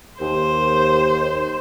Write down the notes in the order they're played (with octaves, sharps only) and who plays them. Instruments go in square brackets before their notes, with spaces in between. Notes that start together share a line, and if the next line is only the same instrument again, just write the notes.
[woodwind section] D#2 [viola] C5